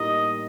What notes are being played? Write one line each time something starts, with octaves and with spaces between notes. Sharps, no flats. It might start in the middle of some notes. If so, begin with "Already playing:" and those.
Already playing: A2 G3 A#3 D#4 D#5